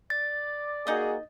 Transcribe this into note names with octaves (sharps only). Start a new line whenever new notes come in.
D5 A6
A#3 D#4 F#4 G#4 D#5